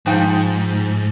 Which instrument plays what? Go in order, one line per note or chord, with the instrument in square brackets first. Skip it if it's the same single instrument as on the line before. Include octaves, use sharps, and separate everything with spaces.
[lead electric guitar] G#2 [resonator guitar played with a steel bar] F3 D#4 G5